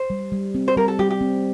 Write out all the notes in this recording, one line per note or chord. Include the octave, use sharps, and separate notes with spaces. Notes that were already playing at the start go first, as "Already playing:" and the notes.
Already playing: C5
G3
G3
C4
C5
G3 A#4
A4
G3 G4
G4
C4